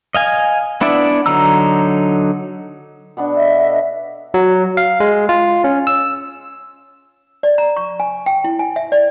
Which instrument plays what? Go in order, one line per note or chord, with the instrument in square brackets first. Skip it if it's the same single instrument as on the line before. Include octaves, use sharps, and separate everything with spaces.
[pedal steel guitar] D#5 F5 G#5
B3 D4 E4 D5 E5
D3 F#3 D#4 A#5 E6
[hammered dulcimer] B2 B3 D4
[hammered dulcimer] A4 [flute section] D#5 E5
[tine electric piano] F#3
F5
G#3
F4
C#4
E6
[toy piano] D5
A#5
C#6
G#5
G5
E4
G#5
E5
D5